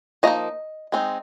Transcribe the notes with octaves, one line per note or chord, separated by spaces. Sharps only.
F3 A#3 D#4 D#5
G#3 C4 D#4